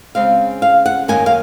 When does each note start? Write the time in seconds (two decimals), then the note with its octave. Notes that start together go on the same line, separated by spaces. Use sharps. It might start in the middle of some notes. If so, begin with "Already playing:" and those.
0.15 C#3 G#3 C4 F5
0.62 F5
0.86 F#5
1.08 F#2 D#3 A#3 C#4 G#5
1.26 F5